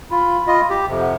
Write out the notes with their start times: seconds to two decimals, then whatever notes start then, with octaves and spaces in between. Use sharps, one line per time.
0.11 F4 B5
0.47 F4 D#5
0.70 G4
0.88 F2 C3
1.01 F#5